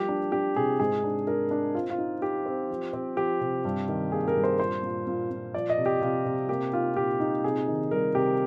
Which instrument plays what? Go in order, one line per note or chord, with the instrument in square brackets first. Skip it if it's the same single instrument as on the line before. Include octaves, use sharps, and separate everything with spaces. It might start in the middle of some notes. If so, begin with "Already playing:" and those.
Already playing: [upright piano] F3 G3 A#3 G4
D4
D4 G4
C3 G#4
G#2 G#4
D4
D4 A#4
D4
C4 F4
F4
D#4
D#4 G4
C4
F3
C4
F3 G4
C3
G2
D#3
A#3 G#4
A#4
G2
C5
A#2 C5
A#2
A#2
A#2
F3 D5
D#5
C3
G4
C3 F4
C3
A#3 G4
D#4 F4
A#2 G4
D#4
C3 G#4
D#3
G3 A#4
C3 G4